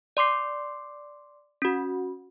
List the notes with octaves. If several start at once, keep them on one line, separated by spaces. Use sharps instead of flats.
D5 C6 D6 C7
C#4 F#4